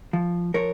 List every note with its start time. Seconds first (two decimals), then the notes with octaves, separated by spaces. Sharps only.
0.13 F3
0.54 F3 A#4 C#5